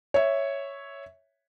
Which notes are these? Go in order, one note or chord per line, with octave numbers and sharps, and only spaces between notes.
C#5 E5